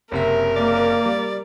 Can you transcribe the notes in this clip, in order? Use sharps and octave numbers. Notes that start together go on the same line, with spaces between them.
F#1 C3 A#4 E5
A#3 D5
G3